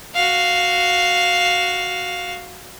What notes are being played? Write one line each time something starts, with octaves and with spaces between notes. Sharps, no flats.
F#4 F5